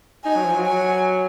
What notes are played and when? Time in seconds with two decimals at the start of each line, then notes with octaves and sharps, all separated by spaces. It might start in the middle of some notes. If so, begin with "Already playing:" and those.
0.25 D#4 G#5
0.36 F#3
0.45 F3
0.56 F#3
0.66 G#5